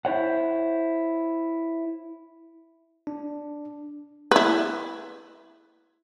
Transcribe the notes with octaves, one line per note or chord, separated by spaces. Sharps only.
E4 C5 C#5 F#5
D4
E4 B4